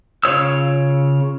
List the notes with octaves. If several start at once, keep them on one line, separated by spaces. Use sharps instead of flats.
C#3 F4 C#5 E6